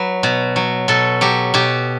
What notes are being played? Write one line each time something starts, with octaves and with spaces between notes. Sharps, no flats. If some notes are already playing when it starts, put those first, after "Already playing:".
Already playing: F#3 B4
B2
F#3
B2 A4
F#3 G4
B2 G4